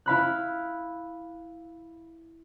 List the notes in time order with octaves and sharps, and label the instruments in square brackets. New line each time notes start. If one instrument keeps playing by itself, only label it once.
[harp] E4 F5 B5 F#6